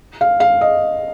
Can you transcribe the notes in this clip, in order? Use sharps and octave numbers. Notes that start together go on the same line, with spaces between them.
F5
F5
D#5